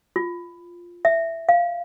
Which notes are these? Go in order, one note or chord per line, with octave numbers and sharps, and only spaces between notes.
F4
E5
F5